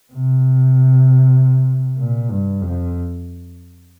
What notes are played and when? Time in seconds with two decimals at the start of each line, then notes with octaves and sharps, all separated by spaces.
0.13 C3
1.99 A#2
2.30 G2
2.61 F2